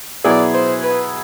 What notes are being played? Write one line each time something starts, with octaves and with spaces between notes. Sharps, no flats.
B2 F#3 B3 E4 G#4 D5
C5
B4